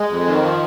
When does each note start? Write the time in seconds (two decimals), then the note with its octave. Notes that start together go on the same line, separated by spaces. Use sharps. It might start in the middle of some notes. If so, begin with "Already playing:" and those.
Already playing: G#3
0.10 F2
0.27 D#3
0.43 F3